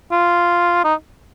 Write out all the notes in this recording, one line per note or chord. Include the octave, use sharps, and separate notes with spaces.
F4
D#4